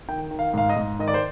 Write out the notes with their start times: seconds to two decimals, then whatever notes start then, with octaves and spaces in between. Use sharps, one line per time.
0.09 D#3 G5
0.31 D#3
0.39 F5
0.54 G#2 F5
0.69 D#5
0.76 G#2
0.99 D#3 D#5
1.08 D5
1.14 C5